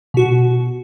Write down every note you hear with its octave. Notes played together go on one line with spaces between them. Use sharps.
B2 F#4